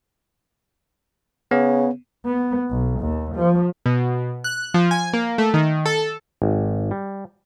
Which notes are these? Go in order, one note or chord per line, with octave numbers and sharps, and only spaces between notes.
C#3 B3
B3
B1
D#2
F3
B2
F#6
F3
G#5
A#3
A3
D#3
A4
G#1
G3